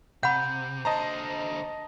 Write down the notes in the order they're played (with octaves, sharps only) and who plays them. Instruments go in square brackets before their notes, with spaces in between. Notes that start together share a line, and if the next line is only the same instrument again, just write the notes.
[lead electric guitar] C3 [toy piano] F#5 B5 [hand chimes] G6
[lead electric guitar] D3 C5 [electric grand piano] D#5 A5 A#5